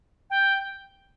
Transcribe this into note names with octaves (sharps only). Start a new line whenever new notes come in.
G5